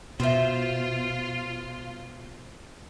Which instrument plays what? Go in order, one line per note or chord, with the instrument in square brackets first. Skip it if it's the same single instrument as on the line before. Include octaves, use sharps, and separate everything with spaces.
[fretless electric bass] B2 [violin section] F4 [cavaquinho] C5 E5